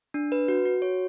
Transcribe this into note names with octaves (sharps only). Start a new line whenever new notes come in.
D4
B4
F#4
F#4
C#5